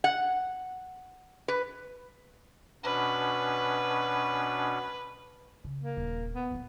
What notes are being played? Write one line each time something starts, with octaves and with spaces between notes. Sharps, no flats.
F#5
B4
B2 C#4 D4 B4
C#3
A#3
D#1
B3
A#2 A3